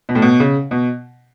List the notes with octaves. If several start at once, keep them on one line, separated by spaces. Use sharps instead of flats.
B2
A2
B2
C#3
B2